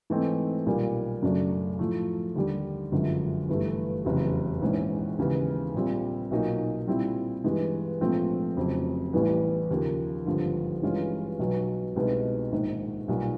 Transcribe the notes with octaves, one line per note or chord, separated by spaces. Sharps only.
G#2 E3 A3 C4 D#4
B1 A#2 G3 A#3
F#2 C#3 F#3 A3 D4
A2 F3 A3
D#2 D3 G3
G1 F#2 D3 F3 G#3
G1 G2 E3 A3
F1 E2 C#3 F#3
A#1 G#2 E3 G#3 C#4
D#2 C#3 E3 G#3 B3
A#1 A#2 G3 C4
B1 A#2 F#3 A#3 D#4
A#2 G3 C4 E4
G2 E3 G#3
A#1 G#2 F3 A3 C4
F1 F2 C#3 F#3
A1 A2 E3 G3 B3
D#2 C#3 F3 A#3
G#1 G2 D3 F3
G2 E3 G#3 C#4 F4
B1 B2 F#3
C2 B2 G#3 B3 D#4
A#1 G#2 D#3
B1 A#2 G3